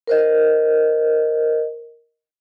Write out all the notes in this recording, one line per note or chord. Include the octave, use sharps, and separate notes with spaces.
A#4 C5 D#5